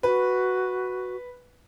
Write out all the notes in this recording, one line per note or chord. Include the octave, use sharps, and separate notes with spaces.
F#4 B4